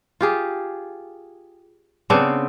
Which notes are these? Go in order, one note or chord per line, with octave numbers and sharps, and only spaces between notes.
F4 G4 G#4
C#3 B3 C4 D4